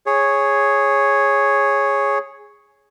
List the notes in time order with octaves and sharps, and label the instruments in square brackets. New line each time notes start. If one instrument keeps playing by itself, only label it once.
[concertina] G#4 C#5